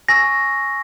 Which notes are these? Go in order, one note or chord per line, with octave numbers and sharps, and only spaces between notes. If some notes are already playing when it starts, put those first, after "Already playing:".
G#5 C#6 E6 A#6